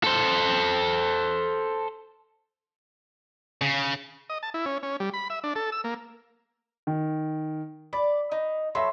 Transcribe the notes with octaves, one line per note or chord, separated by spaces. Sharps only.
A4 C5
C#3
D#5
A5
E4
C#4
C#4
G3
B5
E5
D4
A4
E6
A#3
D#3
D5 B5
D#4
F#3 A4 E5 B5 C6